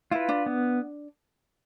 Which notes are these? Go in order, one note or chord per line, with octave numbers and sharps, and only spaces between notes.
E4 F4 B4
D4
B3